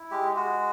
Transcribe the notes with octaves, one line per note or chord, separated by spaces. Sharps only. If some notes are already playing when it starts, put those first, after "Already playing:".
Already playing: E4
G#3 G4
G#3 F#4